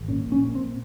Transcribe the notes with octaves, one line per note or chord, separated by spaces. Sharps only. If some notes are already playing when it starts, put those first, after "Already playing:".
Already playing: G#1
A#2 C#4
A#1
C#4
A#2
C4